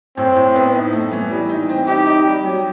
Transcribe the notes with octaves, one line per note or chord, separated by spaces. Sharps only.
A2 C4
A2
B3
D#4
A3
E3
G3
D#4
C4
D#4 G4
D#4
G3
F#3